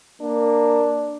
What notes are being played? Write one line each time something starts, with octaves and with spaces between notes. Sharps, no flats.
A#3 D4